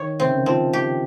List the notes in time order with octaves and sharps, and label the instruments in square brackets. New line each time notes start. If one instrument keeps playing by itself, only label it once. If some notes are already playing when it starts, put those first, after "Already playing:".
Already playing: [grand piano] D#3 [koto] C#5
[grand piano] C3 [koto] C4
[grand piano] C#3
D#3
[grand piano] F3 [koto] C4
[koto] G4